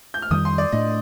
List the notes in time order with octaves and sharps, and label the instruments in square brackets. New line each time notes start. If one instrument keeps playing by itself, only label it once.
[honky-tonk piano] G6
F6
[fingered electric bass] F2 D#3 G3 [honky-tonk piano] D#6
[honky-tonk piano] C6
D5
[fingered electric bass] A2 A3 D4 [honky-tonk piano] D#5